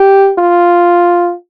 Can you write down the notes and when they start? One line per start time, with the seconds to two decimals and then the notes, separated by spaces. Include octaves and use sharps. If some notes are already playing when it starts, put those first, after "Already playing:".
Already playing: G4
0.39 F4